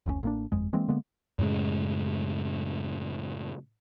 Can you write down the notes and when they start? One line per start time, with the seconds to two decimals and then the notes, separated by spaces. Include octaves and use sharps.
0.06 F#1 D2 C3 C#4
0.23 A1 A#3 D4
0.52 G1 F2 G#3
0.73 E3 G#3 A#3 C4
0.88 D3 G#3 A#3 B3
1.39 F#2 A2 C#3 G#3